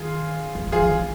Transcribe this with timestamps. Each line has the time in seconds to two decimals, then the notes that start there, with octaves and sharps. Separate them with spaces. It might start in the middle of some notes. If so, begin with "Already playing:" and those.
Already playing: D#3 F4 G#4
0.55 F3
0.67 F3
0.72 F4 G#4
0.79 D3
0.91 D3
0.99 D#3